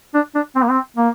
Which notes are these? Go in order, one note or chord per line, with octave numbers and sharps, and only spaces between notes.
D4
D4
C4
A#3
C4
A#3